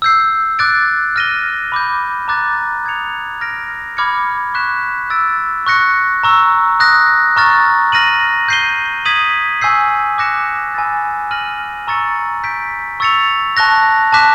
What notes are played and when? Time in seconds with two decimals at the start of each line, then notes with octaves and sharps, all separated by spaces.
0.02 E6 G6 C7
0.59 D6 F#6 A6 D7
1.16 F6 A#6 D#7 G7
1.72 B5 D6 G6
2.28 A#5 D6 F#6 A6
2.84 D#6 G#6 C#7 F7
3.41 F6 A#6 D7
3.97 B5 D6 F6 G#6 C#7
4.54 C#6 F#6 B6 E7
5.10 E6 A6 D7
5.66 C#6 F#6 A#6 C#7
6.23 A#5 C#6 E6
6.80 D#6 F#6 A#6
7.36 A#5 C#6 F6 A6
7.92 F6 A#6 D#7 F#7
8.48 G6 C7 D#7 G7
9.05 D#6 G#6 B6 D#7 F#7
9.61 G#5 C#6 E6 G6 C7
10.18 D6 F#6 A#6 C#7 E7
10.74 G#5 B5 E6 A6
11.31 F6 A#6 D#7 F#7
11.87 A#5 C#6 E6 A6 C#7
12.44 G6 B6 D7
13.00 C#6 E6 A6 C#7 F7
13.57 A5 C#6 F#6 A#6
14.12 A5 D6 F#6 B6 E7